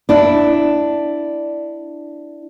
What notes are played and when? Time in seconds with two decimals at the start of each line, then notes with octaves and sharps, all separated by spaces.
0.09 D4 E4